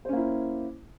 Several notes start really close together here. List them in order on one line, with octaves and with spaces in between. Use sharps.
C5 C#4 A#3 E4